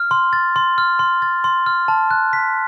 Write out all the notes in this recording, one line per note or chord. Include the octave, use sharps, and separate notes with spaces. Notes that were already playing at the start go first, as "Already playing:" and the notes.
Already playing: F6
C6
A6
C6
F6
C6
A6
C6
F6
A5
F#6
B6